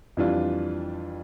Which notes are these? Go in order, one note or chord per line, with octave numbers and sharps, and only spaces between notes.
F2 E3 G3 D4 F4